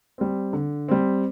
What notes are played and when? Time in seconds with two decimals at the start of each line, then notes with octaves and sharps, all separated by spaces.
0.18 G3 C4
0.53 D3
0.88 G3 C4